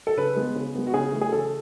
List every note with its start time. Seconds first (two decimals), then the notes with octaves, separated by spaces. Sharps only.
0.07 A4
0.17 C#3 B4
0.36 G#3 B3
0.55 C#3
0.75 G#3 B3
0.87 F#4
0.94 C#3 G#4
1.12 E3 A3
1.21 G#4
1.32 C#3 A4